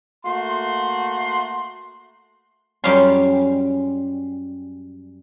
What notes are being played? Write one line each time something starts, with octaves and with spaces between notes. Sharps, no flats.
A3 A#3 F#4 C6
F#2 G3 C#4 F4 F5 C6